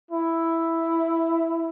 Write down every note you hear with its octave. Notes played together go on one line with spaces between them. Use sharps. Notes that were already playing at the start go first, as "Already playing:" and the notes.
E4